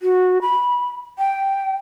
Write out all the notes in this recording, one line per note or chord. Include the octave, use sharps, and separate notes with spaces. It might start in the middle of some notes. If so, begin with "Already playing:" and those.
F#4
B5
G5